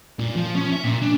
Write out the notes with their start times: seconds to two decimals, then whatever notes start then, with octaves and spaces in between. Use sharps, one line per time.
0.19 A#2
0.36 F3
0.55 C#4
0.72 E5
0.84 A#2
1.02 D4